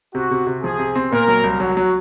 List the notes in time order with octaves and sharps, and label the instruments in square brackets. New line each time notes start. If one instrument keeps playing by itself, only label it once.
[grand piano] C3 [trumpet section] F#4
[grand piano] C3
C3
[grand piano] F3 [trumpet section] G#4
[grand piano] C3
C4
[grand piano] A#2 [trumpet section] A#4
[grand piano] F#3
C2
[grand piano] F#3 [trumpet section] F#4
[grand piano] F#3